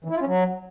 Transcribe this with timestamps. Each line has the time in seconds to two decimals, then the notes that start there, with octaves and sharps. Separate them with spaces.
0.04 E3
0.10 E4
0.16 F4
0.21 C#4
0.27 F#3